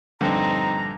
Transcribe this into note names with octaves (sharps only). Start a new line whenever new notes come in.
A#1 G2 D3 C4 D#4 A#5